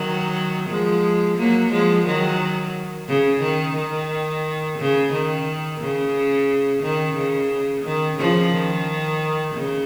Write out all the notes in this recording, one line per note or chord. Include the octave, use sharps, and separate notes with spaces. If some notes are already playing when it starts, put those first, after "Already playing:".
Already playing: D#3 F#3
F3 G#3
F#3 A#3
F3 G#3
D#3 F#3
C#3
D#3
D#3
C#3
D#3
C#3
D#3
C#3
D#3
C#3 F3
D#3
C#3